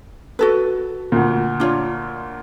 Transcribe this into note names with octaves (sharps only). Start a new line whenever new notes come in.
F#4 A4 B4
D2 A#2
D4 F4 C#5